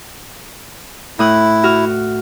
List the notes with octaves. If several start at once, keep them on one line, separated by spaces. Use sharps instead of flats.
A2 E4 D#6 F#6
F#4 F6